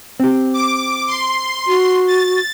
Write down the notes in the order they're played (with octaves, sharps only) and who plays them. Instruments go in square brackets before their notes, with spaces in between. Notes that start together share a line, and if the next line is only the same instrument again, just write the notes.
[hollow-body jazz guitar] C4 G4
[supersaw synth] D6
C6
[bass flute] F#4
[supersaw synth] A6